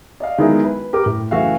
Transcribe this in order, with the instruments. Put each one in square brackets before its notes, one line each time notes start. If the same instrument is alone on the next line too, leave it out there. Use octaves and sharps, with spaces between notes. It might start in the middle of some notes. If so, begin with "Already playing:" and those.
[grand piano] D5 D#5 F5
D#3 F#3 G#3 B3 D#4 E4
B4
G4 A#4 D6
A2
F#1 E3 A3 F#4 E5 F5